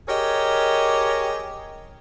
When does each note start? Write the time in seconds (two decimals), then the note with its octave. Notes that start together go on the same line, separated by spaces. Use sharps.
0.08 G4 G#4 A#4 C#5 D#5